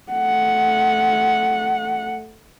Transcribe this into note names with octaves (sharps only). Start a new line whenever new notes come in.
A3 F#5